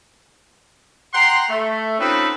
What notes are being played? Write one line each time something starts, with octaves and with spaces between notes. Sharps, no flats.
F#5 G5 A#5 C6
A3
C4 C#4 D#4 F4 A4 B4